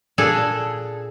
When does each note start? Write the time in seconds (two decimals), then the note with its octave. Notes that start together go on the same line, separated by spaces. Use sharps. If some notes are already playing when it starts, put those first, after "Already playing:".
0.18 A#2 D4 G#4 A4 D5 A5